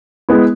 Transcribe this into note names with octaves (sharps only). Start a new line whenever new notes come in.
G#3 B3 E4